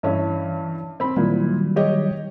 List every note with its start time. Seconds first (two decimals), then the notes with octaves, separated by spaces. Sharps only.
0.03 G2 E3 C#4 E4
1.00 C4 B5
1.16 A#2 D#3 E3 F#3 G3
1.76 G4 C#5 D#5